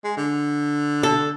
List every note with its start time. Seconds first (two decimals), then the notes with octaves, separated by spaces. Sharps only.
0.04 G#3
0.17 D3
1.03 A4